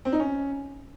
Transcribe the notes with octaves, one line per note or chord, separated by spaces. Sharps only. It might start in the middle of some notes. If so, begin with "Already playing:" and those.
C4
D#4
C#4